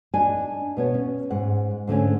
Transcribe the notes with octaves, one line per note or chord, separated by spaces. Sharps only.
D4 D5 D#5 G#5
B2 B3 C#5
C#4
G#2 F#5
G#2 D3 A3 C#4